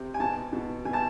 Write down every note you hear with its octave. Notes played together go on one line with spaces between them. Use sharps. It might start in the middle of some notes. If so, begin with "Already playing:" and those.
Already playing: C3
G#5
B2 A5
B2
B2 G#5
A5